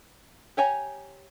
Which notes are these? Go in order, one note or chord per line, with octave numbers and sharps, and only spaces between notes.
G4 C#5 G#5 A#5